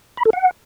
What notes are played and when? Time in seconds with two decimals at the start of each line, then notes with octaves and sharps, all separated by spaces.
0.17 B5
0.25 A4
0.33 F#5